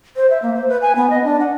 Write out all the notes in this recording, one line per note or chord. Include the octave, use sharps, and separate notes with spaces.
C5
E5
A#3
C5
B4
G#5
B3
D#5
D4
F#5